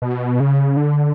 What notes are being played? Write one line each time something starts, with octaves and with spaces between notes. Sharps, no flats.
B2
C#3
D3